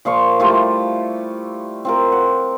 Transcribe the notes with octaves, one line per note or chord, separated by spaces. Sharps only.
A#2 F3 F5 C#6
G3 A3 E4 F4
C4 F4 A#4
F#5